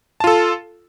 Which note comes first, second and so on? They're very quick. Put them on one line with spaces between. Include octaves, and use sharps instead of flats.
A5 F4 A4